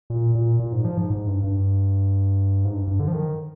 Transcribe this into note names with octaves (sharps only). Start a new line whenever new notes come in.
A#2
A#2
A#2
G#2
F3
G#2
G#2
G2
G2
G#2
G2
G2
D3
F3
D#3